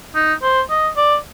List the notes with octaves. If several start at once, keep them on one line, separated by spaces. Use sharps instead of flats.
D#4
C5
D#5
D5